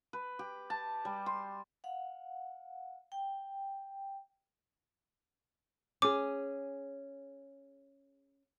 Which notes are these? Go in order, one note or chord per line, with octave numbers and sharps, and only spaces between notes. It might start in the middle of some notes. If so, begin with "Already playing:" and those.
B4
G4
A5
G3
C6
F5 F#5
G5
C#4 G#4 D6